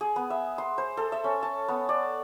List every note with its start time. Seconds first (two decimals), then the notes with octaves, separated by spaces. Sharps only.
0.01 G#4
0.16 B3
0.30 E5
0.58 C6
0.78 C5
0.97 A4
1.12 E5
1.24 C#4
1.43 A5
1.68 B3
1.89 D5